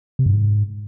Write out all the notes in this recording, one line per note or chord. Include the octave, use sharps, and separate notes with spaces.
C3
G2
G#2